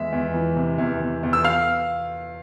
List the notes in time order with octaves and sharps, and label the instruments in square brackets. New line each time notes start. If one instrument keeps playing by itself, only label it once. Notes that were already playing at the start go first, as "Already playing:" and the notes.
Already playing: [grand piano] E2 G#3 E5
E2
E3
C3
E2
E2
E2
E6
F5 F6